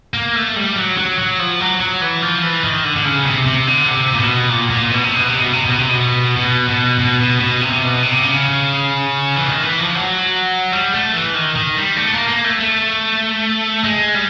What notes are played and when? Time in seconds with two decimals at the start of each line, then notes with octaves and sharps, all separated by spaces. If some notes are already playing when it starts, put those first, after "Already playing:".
0.14 A#3
0.36 A3
0.56 G3
0.76 F#3
0.98 F#3
1.19 F#3
1.39 F3
1.60 F#3
1.80 F#3
2.01 E3
2.22 F3
2.42 E3
2.64 D#3
2.84 D3
2.96 D3
3.05 C#3
3.26 C3
3.46 C3
3.67 D3
3.88 C3
4.14 A#2
4.19 B2
4.49 A#2
4.70 A#2
4.91 B2
5.04 C3
5.16 B2
5.29 C3
5.40 B2
5.53 C3
5.65 B2
5.78 C3
5.90 B2
6.36 B2
6.68 B2
6.99 B2
7.20 B2
7.40 B2
7.61 C3
7.82 B2
8.02 C3
8.23 C#3
9.36 E3
9.48 D#3
9.63 E3
9.80 F3
9.95 F#3
10.72 G3
10.94 A3
11.13 E3
11.35 D#3
11.55 D#3
11.77 G3
11.97 A3
12.13 A#3
12.28 A#3
12.44 A3
12.60 A3
13.84 G#3
14.14 G3